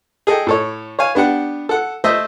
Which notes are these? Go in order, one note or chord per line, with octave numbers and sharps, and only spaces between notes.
G#4 A4 D#5 G5
A2 A4 C#5
C#5 F5 G#5
B3 D4 G4 F#5
A4 F#5
A3 C5 D#5 E5